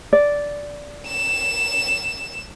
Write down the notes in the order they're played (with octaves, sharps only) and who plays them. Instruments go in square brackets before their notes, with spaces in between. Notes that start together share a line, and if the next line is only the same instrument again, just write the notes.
[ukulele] D5
[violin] E7